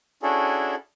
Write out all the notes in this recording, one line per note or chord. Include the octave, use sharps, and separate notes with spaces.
C#4 D4 E4 F#4 G#4 A4